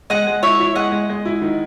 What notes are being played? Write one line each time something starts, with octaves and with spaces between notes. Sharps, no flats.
G#3 D#5 F#5
G#3
E4 C#5 E5
E4
G#3 D#5 F#5
G#3
G#3
E4
D#3